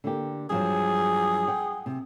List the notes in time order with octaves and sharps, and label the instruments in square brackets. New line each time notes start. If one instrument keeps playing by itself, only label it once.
[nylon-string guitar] D3 A#3 G4
[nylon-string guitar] G2 F3 F#3 [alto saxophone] G#4
[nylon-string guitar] F#5 G5
C3